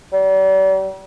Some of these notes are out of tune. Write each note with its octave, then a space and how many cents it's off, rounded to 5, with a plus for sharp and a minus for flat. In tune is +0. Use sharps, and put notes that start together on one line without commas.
G3 -40